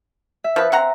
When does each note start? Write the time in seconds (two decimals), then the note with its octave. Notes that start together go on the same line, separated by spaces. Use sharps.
0.44 E5
0.56 F3 B4
0.72 C4 F#5 A#5